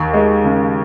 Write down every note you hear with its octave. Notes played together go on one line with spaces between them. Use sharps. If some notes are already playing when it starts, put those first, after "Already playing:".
Already playing: D#2
G#3
C#3